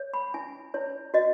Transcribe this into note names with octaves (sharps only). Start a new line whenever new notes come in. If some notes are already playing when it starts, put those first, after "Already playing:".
Already playing: C#5
B5
E4 G#5
E4 C#5
F#4 D#5